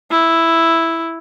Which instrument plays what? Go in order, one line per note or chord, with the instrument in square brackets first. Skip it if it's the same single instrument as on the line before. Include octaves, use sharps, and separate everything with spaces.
[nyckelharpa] E4